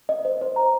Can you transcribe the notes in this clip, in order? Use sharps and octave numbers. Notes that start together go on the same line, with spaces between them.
D#5
C5
C5
A#5